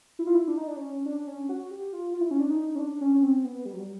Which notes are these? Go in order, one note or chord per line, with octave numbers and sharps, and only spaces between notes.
E4
F4
E4
D4
D#4
D4
C#4
D4
C#4
F#4
G4
F4
F4
E4
C#4
D4
D#4
C#4
D4
C#4
C#4
C4
B3
G3
F#3
G3